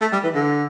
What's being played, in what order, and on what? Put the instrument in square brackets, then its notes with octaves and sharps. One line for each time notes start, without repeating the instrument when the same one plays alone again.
[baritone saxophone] A3
G3
E3
D3